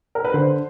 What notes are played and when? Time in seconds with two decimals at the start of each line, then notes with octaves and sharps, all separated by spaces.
0.15 A#4
0.25 B4
0.34 D3 C5